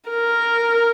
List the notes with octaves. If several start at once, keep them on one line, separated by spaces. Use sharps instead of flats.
A#4